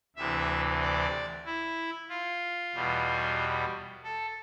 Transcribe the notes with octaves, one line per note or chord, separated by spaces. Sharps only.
D2 C3 E3 E5
D5
E4
F4
E2 B2 G3
A4